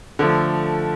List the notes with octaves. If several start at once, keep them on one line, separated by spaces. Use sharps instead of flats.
D3 F3 A3